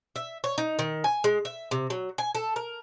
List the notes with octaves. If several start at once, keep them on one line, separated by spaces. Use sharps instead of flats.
E5
C#5
D#4
D#3
G#5
G#3
E5
C3
F#3
G#5
A4
A#4